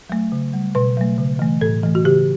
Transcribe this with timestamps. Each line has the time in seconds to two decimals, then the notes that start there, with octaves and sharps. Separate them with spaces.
0.09 F#3 A3
0.32 C#3
0.53 G3
0.75 B2 B4
0.97 F#3 A3
1.18 C#3
1.39 E3 A3
1.61 A2 A4
1.83 E3 A3
1.95 F#4
2.04 C#3 G4